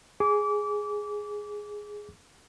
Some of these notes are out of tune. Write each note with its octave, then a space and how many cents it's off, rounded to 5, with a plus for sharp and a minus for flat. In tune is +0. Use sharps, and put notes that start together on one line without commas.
G#4 +0 D6 -25